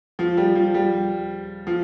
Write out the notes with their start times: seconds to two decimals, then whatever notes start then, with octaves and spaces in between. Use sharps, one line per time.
0.19 F3
0.37 G3
0.55 F3
0.74 G3
1.67 F3